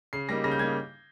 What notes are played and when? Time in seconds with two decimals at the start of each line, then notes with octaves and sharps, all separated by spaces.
0.13 C#3 C7
0.29 G3 A#3 D#4 A#6
0.44 C#3 A#6
0.51 G6
0.59 G3 A#3 D#4 G#6